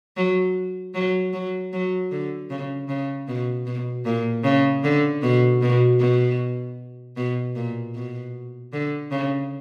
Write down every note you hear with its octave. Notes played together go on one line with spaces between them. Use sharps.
F#3
F#3
F#3
F#3
D3
C#3
C#3
B2
B2
A#2
C#3
D3
B2
B2
B2
B2
A#2
B2
D3
C#3